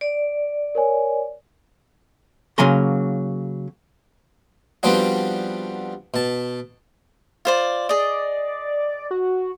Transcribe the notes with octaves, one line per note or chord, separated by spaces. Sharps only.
D5
A#4 C#5 G#5
C#3 F#3 A#3 G#5 A#5 C6
F3 G3 B3 C4 D4 F#4
B2 A5
F4 C5 D5
G#4 D5 D#5
F#4